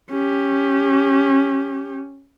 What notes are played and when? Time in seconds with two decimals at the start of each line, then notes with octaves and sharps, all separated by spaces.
0.10 C#4 G4